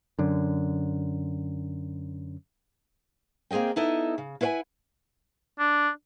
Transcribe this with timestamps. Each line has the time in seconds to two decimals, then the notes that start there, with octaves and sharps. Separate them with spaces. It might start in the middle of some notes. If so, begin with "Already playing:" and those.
0.19 F#2 D3
3.51 A#3 C4 G#4 D#5 G5
3.76 B3 D#4 E4 A4 D#5
4.18 C#3
4.41 E4 B4 C5 F5 F#5 G#5
5.59 D4